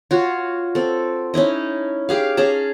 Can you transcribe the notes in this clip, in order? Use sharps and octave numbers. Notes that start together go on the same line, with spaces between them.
F4 F#4 C#5
C4 A4
C#4 D#4 E4 D#5
G4 G#4 F5
C#4 G#4 A5 A#5